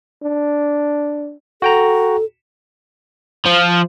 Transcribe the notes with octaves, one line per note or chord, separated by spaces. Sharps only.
D4
F#4 A4 G5 A#5
F3